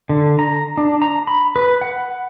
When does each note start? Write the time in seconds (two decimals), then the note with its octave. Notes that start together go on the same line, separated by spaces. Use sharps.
0.09 D3
0.39 A#5
0.78 D4
1.02 A#5
1.27 B5
1.56 B4
1.81 F#5